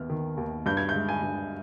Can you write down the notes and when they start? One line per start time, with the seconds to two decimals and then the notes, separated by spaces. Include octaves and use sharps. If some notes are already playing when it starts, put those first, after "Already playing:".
Already playing: D#2 B3 F6
0.10 D#3
0.37 D#2
0.66 G2 G6
0.77 G#6
0.89 G#3 G6
1.09 G#5
1.22 G2